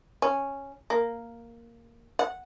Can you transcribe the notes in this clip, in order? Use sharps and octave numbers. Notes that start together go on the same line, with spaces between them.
C#4
A#3
F#5